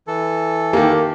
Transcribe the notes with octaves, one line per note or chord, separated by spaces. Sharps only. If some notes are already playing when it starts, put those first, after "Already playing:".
E3 A4
D#3 A#3 G4